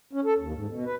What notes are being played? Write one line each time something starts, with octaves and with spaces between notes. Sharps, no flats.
C#4
A4
D#2
G#2
B2
B4